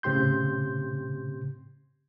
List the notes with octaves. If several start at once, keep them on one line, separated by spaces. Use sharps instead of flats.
A2 C#3 C4 G4 C6 G6